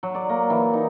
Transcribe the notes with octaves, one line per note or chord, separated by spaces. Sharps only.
F#3
D5
A#3
E3
D#4